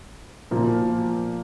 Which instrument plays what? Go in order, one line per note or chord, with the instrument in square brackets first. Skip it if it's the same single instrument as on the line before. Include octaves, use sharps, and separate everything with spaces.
[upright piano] A#2 F3 A#3